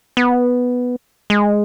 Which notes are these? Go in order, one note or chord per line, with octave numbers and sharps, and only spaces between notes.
B3
G#3